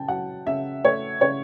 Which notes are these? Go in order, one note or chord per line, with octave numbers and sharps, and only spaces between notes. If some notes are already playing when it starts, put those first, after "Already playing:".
Already playing: C#3 G5 A5
F#3 F#5
C#3 E5
A3 C#5
C#3 C#5